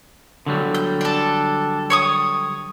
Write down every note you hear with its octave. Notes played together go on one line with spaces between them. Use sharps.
D3 F#3 G3
G6
D4 A4
C#5 C#6 D#6